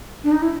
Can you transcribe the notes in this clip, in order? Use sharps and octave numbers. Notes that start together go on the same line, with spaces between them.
D4
D#4
E4